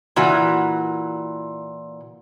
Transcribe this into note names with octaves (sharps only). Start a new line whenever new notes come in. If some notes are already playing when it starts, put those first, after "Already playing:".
A#2 E3 F#4